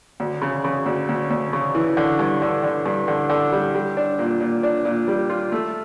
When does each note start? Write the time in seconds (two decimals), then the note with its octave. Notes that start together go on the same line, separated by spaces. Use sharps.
0.20 D2
0.42 C#3
0.64 C#3
0.86 D2
1.09 D2
1.30 D2
1.53 C#3
1.75 E3
1.97 D3
2.19 G2
2.42 D3
2.63 D3
2.86 G2
3.08 D3
3.30 D3
3.52 G3
3.75 G3
3.97 D4
4.19 A#2
4.41 A#2
4.63 D4
4.85 A#2
5.08 G3
5.30 F4
5.52 A3